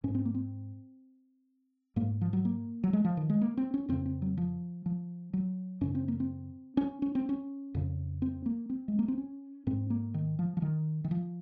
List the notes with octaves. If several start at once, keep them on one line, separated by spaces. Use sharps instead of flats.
G#2 C#4
C4
A#3
C4
G#2 A#3
F3
F#3
A#3
F#3
G#3
F3
D#3
G#3
A#3
C4
C#4
F2 C#3 C4
C4
F#3
F3
F3
F#3
F#2 C#3 C#4
C4
A#3
C4
C#4
C#4
C4
C#4
F2 C#3
C4
A#3
C4
G#3
A#3
C4
C#4
G#2 C4
A#3
D#3
F3
F3
D#3
D#3
F3